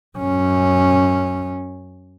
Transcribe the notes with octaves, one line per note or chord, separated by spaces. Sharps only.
F#2 C#4